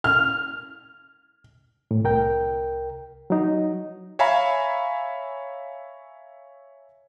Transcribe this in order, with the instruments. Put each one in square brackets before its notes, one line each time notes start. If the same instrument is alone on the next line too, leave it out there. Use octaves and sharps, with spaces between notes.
[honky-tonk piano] F6
[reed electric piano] A2
C2 A#4 G5
F#3 D#4
[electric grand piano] C#5 E5 F5 G#5 A#5 B5